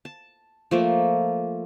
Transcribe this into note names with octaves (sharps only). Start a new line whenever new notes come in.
A5
F3 A3 A#3